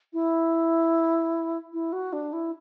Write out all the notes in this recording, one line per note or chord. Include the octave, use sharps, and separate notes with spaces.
E4
E4
F#4
D4
E4